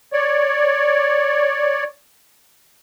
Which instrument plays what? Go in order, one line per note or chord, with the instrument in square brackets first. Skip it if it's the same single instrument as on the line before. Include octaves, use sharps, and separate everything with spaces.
[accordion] C#5 D5